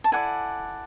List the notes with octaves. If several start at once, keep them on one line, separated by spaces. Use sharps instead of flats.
A5
E4 A4 D5 F#5 G#5